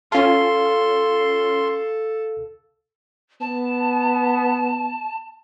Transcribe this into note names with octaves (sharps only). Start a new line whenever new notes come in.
C#4 F4 A4 F5 A5 C6
B3 A5